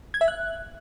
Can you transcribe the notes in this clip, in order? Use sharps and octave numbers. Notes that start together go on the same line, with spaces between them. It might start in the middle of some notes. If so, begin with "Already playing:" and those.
G#6
E5
F#6